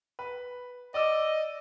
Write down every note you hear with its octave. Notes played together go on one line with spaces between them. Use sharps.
B4
D5 D#5 D6 E6